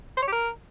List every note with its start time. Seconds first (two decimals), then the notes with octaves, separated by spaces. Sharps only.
0.17 C5
0.22 C#5
0.27 G4
0.32 A#4